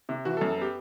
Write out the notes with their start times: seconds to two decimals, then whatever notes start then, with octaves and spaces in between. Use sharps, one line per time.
0.09 C3
0.25 E3 F#4
0.37 A4
0.41 F#2
0.49 A4
0.57 B3 G4